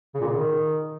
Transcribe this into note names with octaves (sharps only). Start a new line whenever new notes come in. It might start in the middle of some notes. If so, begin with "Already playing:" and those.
C#3
A#2
C#3
D#3